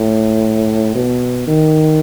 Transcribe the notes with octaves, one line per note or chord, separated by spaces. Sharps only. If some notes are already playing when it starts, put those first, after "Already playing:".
Already playing: A2
B2
D#3